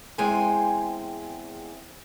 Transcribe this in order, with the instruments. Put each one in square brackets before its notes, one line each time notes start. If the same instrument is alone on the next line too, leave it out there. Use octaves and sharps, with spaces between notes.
[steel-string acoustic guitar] E2 G#3 C4 G5 G#5